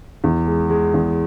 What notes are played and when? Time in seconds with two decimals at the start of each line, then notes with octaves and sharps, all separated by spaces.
0.24 E2
0.47 G#3
0.70 G#3
0.94 E2